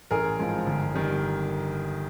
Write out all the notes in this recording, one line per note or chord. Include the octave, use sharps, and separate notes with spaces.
A1 G#4 A#4
G#2 F3 G#3
G1
D#3 G3